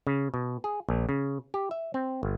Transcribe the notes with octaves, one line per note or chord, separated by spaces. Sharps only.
C#3
B2
G#4
A#1
C#3
G4
E5
C4
G1